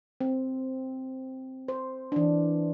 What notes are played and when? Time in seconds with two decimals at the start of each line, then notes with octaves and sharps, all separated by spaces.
0.21 C4
1.68 C5
2.12 E3 D4